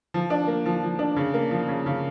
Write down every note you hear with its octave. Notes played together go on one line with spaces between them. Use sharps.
F3
D4
A#3
F3
F3
D4
C#3
A#3
F3
C#3
C#3